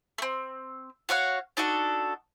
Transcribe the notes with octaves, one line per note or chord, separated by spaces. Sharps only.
A3 C4
F#4 C#5 F5 F#5
D4 D#4 F#4 A4